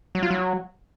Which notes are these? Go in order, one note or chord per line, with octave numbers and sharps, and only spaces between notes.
F#3
F4
F#3